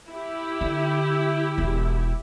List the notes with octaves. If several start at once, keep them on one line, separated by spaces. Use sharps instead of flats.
E4 G4
D3
E1